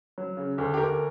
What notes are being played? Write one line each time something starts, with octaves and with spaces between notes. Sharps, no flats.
F#3
C#3
D2
G4
D2 A#4